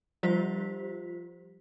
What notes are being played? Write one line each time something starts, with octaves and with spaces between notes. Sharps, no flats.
F3 G3 F4 G4 C5 B6